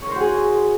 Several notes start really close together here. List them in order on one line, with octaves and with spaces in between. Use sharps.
C#5 A#4 C5 F#4 G#4